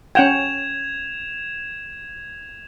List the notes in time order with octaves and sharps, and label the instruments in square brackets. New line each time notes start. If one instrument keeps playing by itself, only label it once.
[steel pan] C#4 F#5 G5 [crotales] G#6 E7 F7